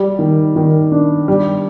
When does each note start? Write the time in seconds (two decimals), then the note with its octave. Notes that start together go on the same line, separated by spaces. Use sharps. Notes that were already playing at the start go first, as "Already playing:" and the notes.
Already playing: G3
0.19 D#3
0.56 D#3
0.92 D4
1.28 G3